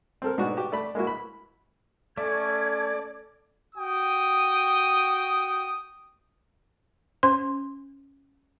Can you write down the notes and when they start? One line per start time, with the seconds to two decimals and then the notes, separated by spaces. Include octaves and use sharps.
0.22 C4 A4 A#4
0.38 G#2 B2 D4 F#4
0.57 F#4 G4
0.72 A3 D5 B5
0.95 G#3 A#3 E4 F#4
1.07 B5
2.18 A3 C#4 A4 D5 G#6
3.76 F#4 G5 D#6
7.23 C#4 C5 C6